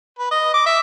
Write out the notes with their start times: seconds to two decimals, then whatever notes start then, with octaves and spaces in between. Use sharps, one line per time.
0.19 B4
0.31 D#5
0.54 D6
0.66 E5